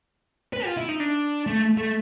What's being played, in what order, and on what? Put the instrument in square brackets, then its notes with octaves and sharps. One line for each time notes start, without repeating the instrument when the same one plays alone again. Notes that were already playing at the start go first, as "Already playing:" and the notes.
[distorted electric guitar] B4
F4
E4
D#4
D4
A3
A3